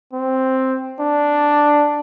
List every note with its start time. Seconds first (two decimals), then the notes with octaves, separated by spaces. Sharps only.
0.13 C4
1.00 D4